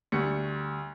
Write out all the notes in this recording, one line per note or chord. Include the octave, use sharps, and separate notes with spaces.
D2 G3 C#6 C#7